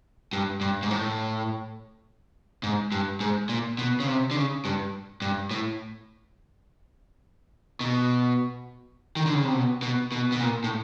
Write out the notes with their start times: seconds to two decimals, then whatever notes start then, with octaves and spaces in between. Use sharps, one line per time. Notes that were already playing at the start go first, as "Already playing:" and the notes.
0.33 G2
0.61 G2
0.82 G#2
0.91 A2
2.63 G#2
2.92 G2
3.20 G#2
3.49 A#2
3.78 B2
4.00 C#3
4.07 C3
4.31 D3
4.36 C#3
4.65 G2
5.22 G2
5.51 A2
7.80 B2
9.16 D#3
9.26 D3
9.34 C#3
9.44 C3
9.53 B2
9.82 B2
10.12 B2
10.32 B2
10.40 A#2
10.64 A2